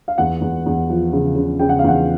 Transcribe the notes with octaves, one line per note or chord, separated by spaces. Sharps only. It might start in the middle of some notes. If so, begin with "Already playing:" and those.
F5
E2 F#5
E2
E2
F3
C#3
C#3
C#3 G5
F#5
F5
E2 F#5